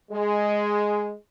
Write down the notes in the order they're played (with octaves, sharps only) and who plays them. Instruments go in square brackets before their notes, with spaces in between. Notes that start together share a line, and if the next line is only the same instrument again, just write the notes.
[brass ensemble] G#3